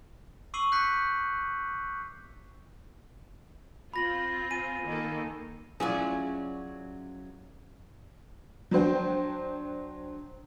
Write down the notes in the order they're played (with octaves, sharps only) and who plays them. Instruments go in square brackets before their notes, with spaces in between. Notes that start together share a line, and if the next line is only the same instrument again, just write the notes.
[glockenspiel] C#6 D6 E6 C7 D#7 F#7
F#6 G6 B6 C#7
[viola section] C4 F4 [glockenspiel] B5 A#6 F#7
[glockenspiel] G#5 D#7
[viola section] D#3 A#3 A4
[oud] F#3 C#4 [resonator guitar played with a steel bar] E4 F4 D5 [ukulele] G#4
[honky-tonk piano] F#3 D4 C5 G5